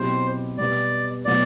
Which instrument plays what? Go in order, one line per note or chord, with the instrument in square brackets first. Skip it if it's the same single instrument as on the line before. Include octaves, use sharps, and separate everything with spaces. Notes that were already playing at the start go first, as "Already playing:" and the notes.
Already playing: [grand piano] B2 F#3 C4 E4 G4 [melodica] C5
[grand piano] B2 G3 B3 [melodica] D5
[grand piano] B2 F#3 B3 F#4 [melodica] D5